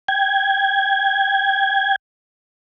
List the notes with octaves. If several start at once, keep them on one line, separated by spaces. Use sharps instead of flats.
G5 G#6